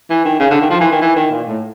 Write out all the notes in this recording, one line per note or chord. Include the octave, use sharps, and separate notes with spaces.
E3
D#3
C#3
D3
D#3
F3
E3
D#3
E3
D#3
A#2
A2